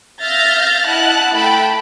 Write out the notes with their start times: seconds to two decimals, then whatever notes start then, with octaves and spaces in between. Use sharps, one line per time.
0.22 E5 F5 F6 G6 A6 A#6
0.86 E4 D#5 F#5 A5 F#6
1.35 A3 E4 G5 A5 B5